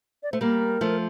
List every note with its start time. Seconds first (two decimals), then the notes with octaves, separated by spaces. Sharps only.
0.23 D5
0.32 A3 C5
0.41 G3 A#3 A#4
0.81 F3 A3